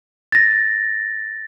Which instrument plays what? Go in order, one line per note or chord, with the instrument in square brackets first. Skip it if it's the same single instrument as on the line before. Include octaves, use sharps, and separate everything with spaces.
[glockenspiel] A6 A#6